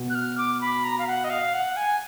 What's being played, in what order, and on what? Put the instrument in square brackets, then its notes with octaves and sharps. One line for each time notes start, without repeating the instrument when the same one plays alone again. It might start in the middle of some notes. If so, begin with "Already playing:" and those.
Already playing: [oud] B2
[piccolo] F#6
F6
D6
B5
A#5
F5
F#5
D#5
F5
F#5
G#5